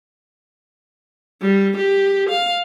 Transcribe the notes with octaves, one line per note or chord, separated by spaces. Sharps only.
G3
G4
F5